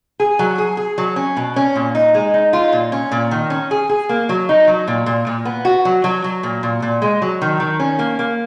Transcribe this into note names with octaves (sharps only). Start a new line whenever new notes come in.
G#4
F#3
G#4
G#4
F#3
C#4
B2
C#4
A#2
D#4
G#3
D#4
F4
A#2
C#4
A#2
D#3
C#4
G#4
G#4
A#3
F#3
D#4
F#3
A#2
A#2
A#2
B3
F#4
F#3
F#3
F#3
A#2
A#2
A#2
G#3
F#3
D#3
D#3
C#4
A#3
A#3